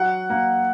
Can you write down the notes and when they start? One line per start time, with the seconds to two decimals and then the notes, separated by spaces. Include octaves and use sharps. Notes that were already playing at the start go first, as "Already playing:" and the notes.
Already playing: F#3 F#5
0.30 A#3